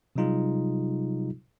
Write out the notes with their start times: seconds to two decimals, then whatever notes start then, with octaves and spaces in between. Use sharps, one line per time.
0.16 C3 F#3 G3 D#4 F4 G#4